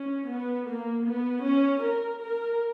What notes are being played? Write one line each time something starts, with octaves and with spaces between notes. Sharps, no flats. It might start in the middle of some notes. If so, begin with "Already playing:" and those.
Already playing: C#4
B3
A#3
B3
C#4
A#4
A#4